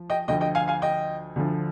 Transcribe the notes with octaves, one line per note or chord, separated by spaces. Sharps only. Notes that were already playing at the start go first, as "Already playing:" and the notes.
Already playing: F3
D#5 G5
D2 D3 F3 D#5 G5
D#5 G5
F5 G#5
F5 G#5
D#5 G5
D2 D3 F3